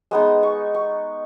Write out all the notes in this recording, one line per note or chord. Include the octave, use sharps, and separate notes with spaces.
G#3 B3 D#4 D#6
C#6
C#6